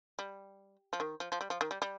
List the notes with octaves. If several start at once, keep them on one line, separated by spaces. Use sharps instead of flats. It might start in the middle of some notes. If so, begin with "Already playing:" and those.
G3
F3
D#3
F3
F3
G3
F3
D#3
G3
G3